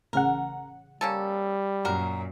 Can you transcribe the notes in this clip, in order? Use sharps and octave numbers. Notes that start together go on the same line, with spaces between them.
A1 C#3 A#4 F#5
G3 A#3 C#4 A4
F#2 A#2 F#4 A#4